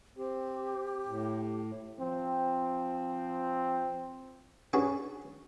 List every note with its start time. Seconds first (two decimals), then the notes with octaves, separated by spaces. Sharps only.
0.17 C4 G4
1.07 A2
2.00 F3 C4
4.73 C#4 D4 F#4 G#4 B4